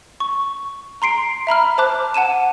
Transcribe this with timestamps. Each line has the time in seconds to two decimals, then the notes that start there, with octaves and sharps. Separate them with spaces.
0.20 C#6
1.02 A#5 C6 C7 D7
1.47 E5 A#5 B5 F6
1.78 C5 A5 A#5 D6 F#6
2.14 F#5 A5 D#7 E7